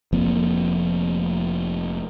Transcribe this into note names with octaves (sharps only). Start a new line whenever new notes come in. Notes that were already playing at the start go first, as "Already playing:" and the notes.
F1 F3 A#3 C4